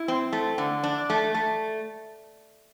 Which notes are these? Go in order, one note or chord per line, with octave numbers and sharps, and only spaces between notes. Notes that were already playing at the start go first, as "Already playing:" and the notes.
Already playing: E4
C4
A3
D3
D4
A3
A3